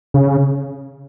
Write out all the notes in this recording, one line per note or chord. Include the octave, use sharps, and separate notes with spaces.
C#3